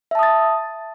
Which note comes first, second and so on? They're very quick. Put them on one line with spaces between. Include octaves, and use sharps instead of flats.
E5 A5 D#6 A6